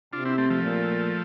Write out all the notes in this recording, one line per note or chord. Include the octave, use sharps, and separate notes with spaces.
C3 D4 F4
C4 E4
A3 C4
F3 A3
A#2